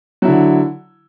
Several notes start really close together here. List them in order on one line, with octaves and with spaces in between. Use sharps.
F#3 E4 D3